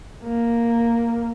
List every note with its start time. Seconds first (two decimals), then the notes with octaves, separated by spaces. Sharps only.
0.24 A#3